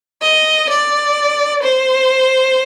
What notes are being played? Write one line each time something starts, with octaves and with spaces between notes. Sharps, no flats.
D#5
D5
C5